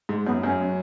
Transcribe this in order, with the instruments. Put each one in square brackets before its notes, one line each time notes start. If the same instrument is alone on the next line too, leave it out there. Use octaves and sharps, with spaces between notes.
[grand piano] G#2 [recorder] G#3
[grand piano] F#2 [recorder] B3
[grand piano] F#2 [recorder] C#4